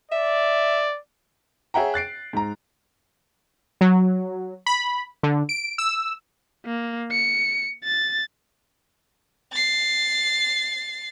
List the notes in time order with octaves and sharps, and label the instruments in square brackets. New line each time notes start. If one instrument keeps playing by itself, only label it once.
[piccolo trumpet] D5 [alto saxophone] E5
[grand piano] G#4 C#5 E5 F#5 G5 A#5
F#6 A6 C7 D7
G#2 A#5
[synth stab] F#3
B5
D3
D7
E6
[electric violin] A#3
C#7
A6
[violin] A6 C7